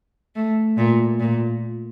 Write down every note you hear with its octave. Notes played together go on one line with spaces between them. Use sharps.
A3
A#2
A#2